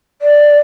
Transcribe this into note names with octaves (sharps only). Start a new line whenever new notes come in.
D5